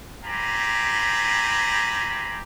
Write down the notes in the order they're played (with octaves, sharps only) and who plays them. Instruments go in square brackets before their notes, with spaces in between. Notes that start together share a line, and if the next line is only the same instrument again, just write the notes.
[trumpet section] C4 F4 G4 G#5 A#5 B5